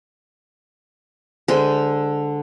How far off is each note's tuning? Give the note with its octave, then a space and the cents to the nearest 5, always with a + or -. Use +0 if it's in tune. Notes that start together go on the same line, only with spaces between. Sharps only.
D3 +0 G#3 -15 C5 -15